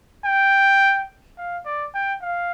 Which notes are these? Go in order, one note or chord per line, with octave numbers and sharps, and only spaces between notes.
G5
F5
D5
G5
F5